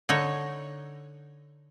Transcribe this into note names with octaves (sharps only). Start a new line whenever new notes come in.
D3 D#4 C#5